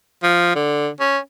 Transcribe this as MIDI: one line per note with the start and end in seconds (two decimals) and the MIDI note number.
0.23 0.53 53
0.55 0.89 50
1.00 1.18 61